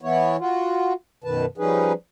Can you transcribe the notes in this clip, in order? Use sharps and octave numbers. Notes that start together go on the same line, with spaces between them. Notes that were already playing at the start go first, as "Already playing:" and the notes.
E3 B3 E4 C#5
F4 F#4
F#2 B2 D#3 B4 A5
F3 G3 C#4 D#4 G#4 B4